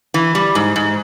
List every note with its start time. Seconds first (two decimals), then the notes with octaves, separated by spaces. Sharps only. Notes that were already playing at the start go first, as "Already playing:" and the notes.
0.14 E3
0.35 G3
0.55 G#2
0.76 G#2